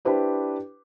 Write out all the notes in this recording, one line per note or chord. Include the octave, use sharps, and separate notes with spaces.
D4 E4 G4 B4 C5